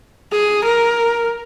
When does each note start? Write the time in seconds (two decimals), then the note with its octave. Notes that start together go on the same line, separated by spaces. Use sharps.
0.32 G#4
0.65 A#4